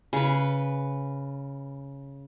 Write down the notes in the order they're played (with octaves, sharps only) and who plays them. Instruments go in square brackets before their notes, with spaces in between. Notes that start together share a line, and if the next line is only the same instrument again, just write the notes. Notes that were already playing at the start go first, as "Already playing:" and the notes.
[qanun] C#3 B4